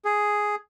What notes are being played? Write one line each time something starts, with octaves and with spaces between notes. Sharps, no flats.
G#4